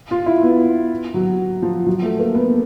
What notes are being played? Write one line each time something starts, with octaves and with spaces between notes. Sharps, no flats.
F4
E4
B3
F#3
F3
F#3
A3
A#3
B3